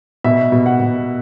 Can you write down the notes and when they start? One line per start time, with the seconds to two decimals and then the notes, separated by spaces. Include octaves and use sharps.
0.24 B2 E5
0.52 B2
0.66 F#5
0.80 B2